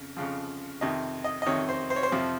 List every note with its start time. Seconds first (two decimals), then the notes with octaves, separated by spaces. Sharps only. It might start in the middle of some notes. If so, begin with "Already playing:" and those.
Already playing: F2 C#3
0.17 F2 C#3 F3
0.81 F2 C3 D#3 D#5
1.24 D#5
1.42 D#5
1.46 F2 C3 D#3 C#5
1.69 C5
1.90 C5
1.96 C#5
2.03 C5
2.12 F2 C3 F3